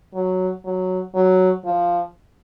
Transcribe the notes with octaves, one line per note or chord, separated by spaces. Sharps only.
F#3
F#3
F#3
F3